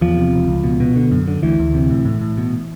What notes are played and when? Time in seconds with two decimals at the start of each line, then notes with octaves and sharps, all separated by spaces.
0.01 E2 F3
0.17 C3
0.33 E1
0.48 C#2
0.64 B2
0.80 B2
0.96 D3
1.12 F#2
1.28 D3
1.43 D2 E3
1.59 D2
1.74 C3
1.90 A2
2.05 A2
2.21 A2
2.37 B2